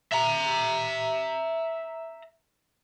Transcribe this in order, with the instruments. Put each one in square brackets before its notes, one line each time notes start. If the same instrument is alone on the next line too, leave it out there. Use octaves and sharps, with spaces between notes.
[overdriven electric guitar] E5 A#5